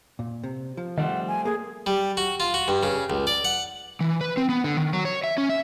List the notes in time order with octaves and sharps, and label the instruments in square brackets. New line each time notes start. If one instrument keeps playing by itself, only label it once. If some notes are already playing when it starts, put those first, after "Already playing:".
[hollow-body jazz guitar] A#2
C3
F3
[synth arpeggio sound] D#3 [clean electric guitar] G3 A3 C4 [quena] F#5
[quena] G#5
[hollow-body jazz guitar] A3 A#3 [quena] G#4
[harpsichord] G3
F#4
F4
F#4
G2
C#3
C#2
D5
F#5
[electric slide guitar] E3
B4
C4
B3
D3
D#3
F#3
C#5
E5
C#4
E5